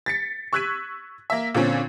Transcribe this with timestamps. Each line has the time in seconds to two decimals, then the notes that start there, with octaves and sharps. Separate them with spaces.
0.06 A6 B6 C#7
0.53 C#6 E6 F#6 G#6 B6 D#7
1.30 A#3 E5
1.55 A#2 D3 C4 C#4